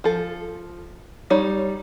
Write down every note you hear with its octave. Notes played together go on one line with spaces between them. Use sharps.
F3 A4
G3 D#4 C#5